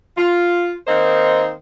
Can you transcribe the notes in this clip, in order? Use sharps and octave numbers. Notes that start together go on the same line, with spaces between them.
F4
D#3 A#3 C4 D#4 C5 D#5